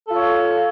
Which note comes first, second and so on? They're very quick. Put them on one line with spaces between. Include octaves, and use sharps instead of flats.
A4 F4 C#5